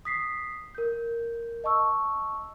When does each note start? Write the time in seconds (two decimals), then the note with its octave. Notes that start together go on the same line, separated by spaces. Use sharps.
0.05 D#6 B6 C7
0.75 A#4 G6
1.64 D#5 A5 C#6 E6